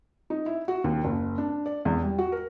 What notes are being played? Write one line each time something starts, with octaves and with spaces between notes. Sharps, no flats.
D#4
E4
F#4
D#2
F#1
D4
D5
E2
G3
F#4
A#4